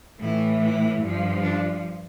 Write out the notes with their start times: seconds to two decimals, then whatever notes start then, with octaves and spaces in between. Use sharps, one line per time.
0.20 A2 E3 E4
0.61 E4
1.01 G2 F3
1.42 D4